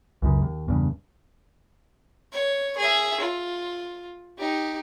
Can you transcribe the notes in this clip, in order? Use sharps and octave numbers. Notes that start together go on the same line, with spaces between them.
C#2 F#2 C#3
D#2
E2 G2 C#3
C#5
G#4 E5
F4
D#4 G4